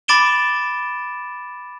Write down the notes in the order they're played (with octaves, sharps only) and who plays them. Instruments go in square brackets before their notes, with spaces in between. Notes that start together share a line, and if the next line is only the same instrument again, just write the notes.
[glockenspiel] B5 D6 A6 D7 E7 G7